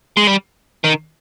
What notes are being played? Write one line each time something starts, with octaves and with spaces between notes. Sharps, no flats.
G#3
G3
D#3